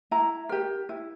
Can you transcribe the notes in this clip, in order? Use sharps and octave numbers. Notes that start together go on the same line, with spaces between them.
E4 A#5
G4 A#4
E4